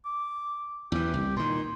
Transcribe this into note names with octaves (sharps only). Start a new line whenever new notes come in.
D6
E2 E3 G4
C2
A#2 D#3 C6